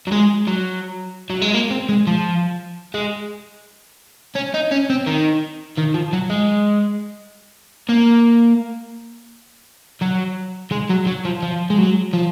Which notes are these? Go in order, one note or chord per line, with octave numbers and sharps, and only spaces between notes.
F#3
G#3
F#3
F#3
G#3
A#3
C4
G#3
F3
G#3
C#4
D#4
C#4
C4
D#3
D#3
F3
F#3
G#3
A#3
F#3
G#3
F#3
F#3
F3
F3
G#3
F#3
F3